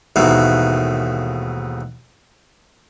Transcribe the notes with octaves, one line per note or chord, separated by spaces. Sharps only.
D#2 G#2 B2 E3 A3 A#3